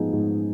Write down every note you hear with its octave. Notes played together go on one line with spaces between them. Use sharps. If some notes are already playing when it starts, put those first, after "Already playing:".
Already playing: G#2 F3 B3 D#4 G#4
G#2